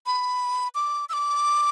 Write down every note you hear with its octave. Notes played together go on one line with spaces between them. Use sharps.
B5
D6
E6
D6